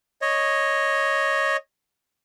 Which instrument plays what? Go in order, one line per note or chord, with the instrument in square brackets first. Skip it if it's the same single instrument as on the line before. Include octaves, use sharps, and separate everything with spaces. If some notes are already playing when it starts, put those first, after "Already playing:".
[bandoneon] C#5 D#5